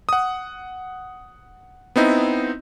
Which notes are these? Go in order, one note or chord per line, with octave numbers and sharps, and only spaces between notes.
F#5 D#6
B3 C4 D#4 E4